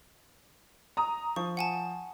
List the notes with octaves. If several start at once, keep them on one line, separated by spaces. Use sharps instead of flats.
A#5 D#6
F3 C#6
F#5 G#5 A5